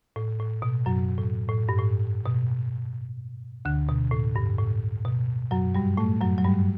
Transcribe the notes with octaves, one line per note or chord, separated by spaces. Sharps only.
A2
A2
B2
F#2 F#3
A2
A2
G2
A2
B2
D2 D3
B2
A2
G2
A2
B2
F#2 F#3
G2 G3
A2 A3
F#2 F#3
F#3
G2 G3